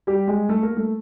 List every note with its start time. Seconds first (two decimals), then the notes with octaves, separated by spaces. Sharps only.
0.07 G3 G4
0.27 G#3 G#4
0.49 A3 A4
0.63 A#3 A#4
0.76 A3 A4